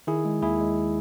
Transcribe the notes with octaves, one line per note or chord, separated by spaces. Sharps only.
D#3 E4 G#4
G#3
D#2 E4 G#4
G#3